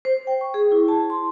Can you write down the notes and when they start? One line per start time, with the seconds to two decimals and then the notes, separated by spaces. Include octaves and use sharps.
0.05 C5
0.27 G5
0.41 C#6
0.54 G#4
0.72 E4
0.88 A5
1.10 C6